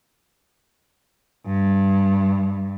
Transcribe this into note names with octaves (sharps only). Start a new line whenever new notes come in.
G2